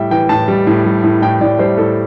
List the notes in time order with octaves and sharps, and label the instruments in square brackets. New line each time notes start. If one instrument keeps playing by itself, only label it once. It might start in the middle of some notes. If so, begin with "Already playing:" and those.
Already playing: [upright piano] A2 G3 E5 G5
E3 G5
A2 A5
G3
A2
G3
A2
A2 G5
A2 D5
G3 C5
A2 A4